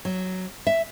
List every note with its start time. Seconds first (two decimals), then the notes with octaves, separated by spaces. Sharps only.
0.05 F#3
0.67 E5